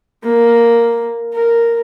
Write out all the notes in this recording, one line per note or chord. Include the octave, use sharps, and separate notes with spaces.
A#3
A#4